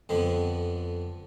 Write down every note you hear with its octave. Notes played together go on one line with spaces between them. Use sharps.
F2 D3 B3